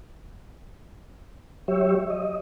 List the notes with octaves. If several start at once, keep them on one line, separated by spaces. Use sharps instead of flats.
F#3 G4 C#5 E5
D#5